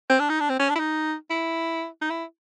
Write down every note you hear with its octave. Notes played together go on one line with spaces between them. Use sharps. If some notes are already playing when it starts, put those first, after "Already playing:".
C4
D4
D#4
D4
C4
C#4
D4
E4
D#4
E4
D#4
E4